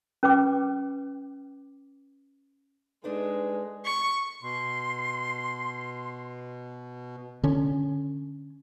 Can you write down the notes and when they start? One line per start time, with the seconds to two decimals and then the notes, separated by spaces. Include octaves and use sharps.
0.23 C#4 B4 G5 D6
3.04 G#3 D4 D#4 A4 B4
3.85 C#6
4.43 B2 C6
7.43 D3 C#4